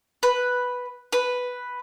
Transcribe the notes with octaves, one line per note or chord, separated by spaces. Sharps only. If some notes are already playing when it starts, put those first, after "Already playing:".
B4
B4